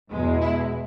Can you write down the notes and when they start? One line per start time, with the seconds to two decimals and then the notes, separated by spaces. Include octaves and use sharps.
0.11 E2 B2 G#3
0.41 E4